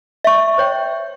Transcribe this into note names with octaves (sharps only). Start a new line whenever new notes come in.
E5 C#6
C5 C#5 G5